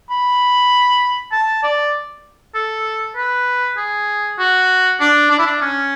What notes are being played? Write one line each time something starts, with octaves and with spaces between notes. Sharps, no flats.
B5
A5
D5
A4
B4
G#4
F#4
D4
D4
E4
D4
C#4